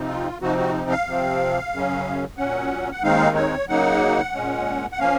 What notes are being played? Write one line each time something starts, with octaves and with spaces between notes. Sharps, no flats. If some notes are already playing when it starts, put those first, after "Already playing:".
Already playing: C3 F3 C4 D#4
F4
C3 F3 C4 D#4 F#4
F#4
F5
C3 F3 C4
F#2 C#3 F#3 C#4
A#2 F#3 C#4 F#5
F#5
D#2 D#3 G#3 C4 D#4 F5
C#5
C#3 F#3 A#3 D#4 F#5
A#2 G#3 C#4
F#5
F3 A#3 C#4 F5